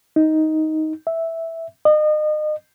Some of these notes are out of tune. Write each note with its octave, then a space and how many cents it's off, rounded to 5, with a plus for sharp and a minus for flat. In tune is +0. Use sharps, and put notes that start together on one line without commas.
D#4 +10
E5 -5
D#5 -35